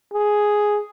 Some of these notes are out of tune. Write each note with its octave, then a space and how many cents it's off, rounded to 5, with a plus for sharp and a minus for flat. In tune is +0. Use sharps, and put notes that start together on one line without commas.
G#4 +5